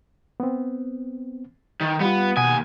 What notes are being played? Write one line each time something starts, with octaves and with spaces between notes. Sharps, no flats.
B3 C4
D#3
G3 B3 F4
D#2 B2 F#5 G#5 D#6